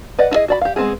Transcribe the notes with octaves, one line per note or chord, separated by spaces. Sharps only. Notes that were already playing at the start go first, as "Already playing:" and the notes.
B4 D5 D#5 F#5
D#4 E4 F#4 G#4 D#5
F#4 D5 B5
G4 F5
G#3 B3 C4 E4 G#4